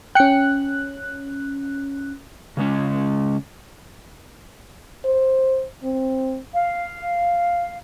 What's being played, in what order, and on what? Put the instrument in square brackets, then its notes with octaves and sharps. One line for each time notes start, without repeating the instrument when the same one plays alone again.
[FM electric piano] C#4 F#6 [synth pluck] G5 C#7
[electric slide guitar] C#3 G#3 C#4
[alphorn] C5
C4
[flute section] F5